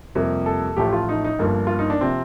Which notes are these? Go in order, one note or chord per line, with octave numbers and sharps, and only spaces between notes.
F2 C3 G3 A#3
A4
A1 A2 F3 A3 G4
F4
D#4
D#4
G1 G2 F3 A#3
F4
D#4
D4
C3 F3 C4